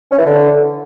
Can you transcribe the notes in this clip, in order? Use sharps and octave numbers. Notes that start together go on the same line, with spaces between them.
C#4
E3
D3